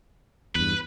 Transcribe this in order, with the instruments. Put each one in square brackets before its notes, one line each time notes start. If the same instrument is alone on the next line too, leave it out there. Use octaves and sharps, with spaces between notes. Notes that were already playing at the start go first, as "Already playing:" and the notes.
[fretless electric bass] E2 G2 [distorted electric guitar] B4